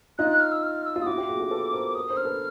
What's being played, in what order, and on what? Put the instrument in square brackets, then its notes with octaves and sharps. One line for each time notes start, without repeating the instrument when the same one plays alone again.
[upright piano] D#4 F4 [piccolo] F#6
[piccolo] F#6
F6
E6
F6
E6
[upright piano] F4
[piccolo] D#6
[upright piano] E4 F#4 [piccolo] D6
[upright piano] F4 G4
F#4 G#4
G4 A4
A4 B4
A#4 C5
[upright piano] A4 B4 [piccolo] D#6
[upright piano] A#4 C5
[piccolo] F6
[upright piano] A4 B4